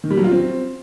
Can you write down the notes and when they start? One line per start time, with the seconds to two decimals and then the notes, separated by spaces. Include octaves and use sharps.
0.04 D#3
0.11 G3
0.17 F#3
0.24 F4
0.31 C4